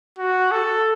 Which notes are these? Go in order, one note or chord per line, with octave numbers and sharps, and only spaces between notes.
F#4
A4